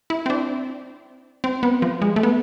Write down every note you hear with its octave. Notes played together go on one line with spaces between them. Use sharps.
E4
C4
D4
C4
B3
F3
G#3
A3
B3